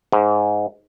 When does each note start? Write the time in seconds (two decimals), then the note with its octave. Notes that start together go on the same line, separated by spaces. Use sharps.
0.12 G#2